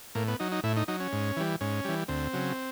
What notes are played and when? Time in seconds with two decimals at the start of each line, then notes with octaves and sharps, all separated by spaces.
0.15 A2 A#3
0.28 B3
0.40 F#3 D#4
0.52 D#4
0.63 A2 E4
0.77 D#4
0.88 F#3 D#4
1.00 C#4
1.12 G#2
1.37 E3 G3
1.61 G#2 C#4
1.85 E3 G3
2.08 D2 C4
2.33 C#3 F#3